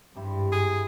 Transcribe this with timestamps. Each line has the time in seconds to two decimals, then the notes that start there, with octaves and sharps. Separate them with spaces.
0.16 G#1 G2 E4 G4 C5
0.52 G#4